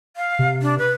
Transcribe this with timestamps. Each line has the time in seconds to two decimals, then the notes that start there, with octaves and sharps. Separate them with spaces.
0.17 F5
0.39 C3
0.62 D4
0.78 B4